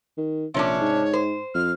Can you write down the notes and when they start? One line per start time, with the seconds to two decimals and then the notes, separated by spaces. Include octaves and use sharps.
0.17 D#3
0.54 A#1 C3 C#4 D4 C#5
0.81 G#2
1.13 C5
1.54 F2 F6